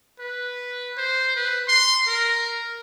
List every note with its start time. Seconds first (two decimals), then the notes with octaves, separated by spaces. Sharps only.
0.19 B4
0.97 C5
1.36 B4
1.68 C6
2.07 A#4